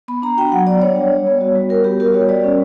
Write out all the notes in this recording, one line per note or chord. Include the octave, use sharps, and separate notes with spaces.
B3 B5
D4 A#5
F#4 G5
F#3 F#5
B3 D5
D4 C#5
G3
G3
B3
F#4
G3
G3 A#4
B3 G4
F#4 A#4
G3 C#5
G3 D5
C#4